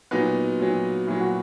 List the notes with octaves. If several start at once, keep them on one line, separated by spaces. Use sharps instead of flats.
A#2 F#3 B3 D#4
A#2 F#3
A#2 F#3 E4
F#4